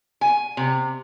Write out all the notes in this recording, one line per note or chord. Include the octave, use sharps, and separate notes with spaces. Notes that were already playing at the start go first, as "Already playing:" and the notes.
G#5
C3